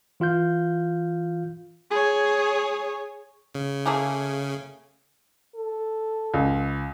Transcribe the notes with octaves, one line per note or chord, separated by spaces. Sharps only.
E3 F4 F5 G6
G#4 C#5
C#3
A3 A#3 G#4
A4
C#2